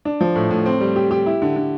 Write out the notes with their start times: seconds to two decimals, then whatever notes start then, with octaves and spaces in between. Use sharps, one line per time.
0.05 D4
0.21 F3
0.36 A2
0.51 A2
0.66 C4
0.81 G3
0.96 G4
1.11 G4
1.26 E4
1.42 D3
1.56 D3